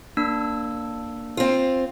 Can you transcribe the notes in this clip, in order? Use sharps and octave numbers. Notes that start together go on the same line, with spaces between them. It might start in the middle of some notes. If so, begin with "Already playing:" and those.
A#3 D4 E6
C4 F4